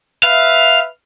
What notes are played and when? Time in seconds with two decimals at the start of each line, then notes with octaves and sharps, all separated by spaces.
0.23 B4 E5 F5